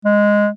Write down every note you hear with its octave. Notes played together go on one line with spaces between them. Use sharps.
G#3